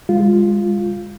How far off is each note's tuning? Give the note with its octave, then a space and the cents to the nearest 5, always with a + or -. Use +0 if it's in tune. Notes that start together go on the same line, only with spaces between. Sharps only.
G#3 -30 F4 +0